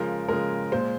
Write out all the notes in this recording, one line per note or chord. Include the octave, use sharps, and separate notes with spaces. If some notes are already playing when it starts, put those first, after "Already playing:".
Already playing: C#3 F3 G#3 A#4
C#3 F3 G#3 A#4
A#2 G#3 C5